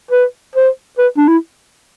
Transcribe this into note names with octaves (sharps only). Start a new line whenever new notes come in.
B4
C5
B4
D4
E4